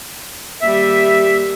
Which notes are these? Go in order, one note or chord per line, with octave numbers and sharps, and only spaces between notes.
D#3 G3 A#3 E5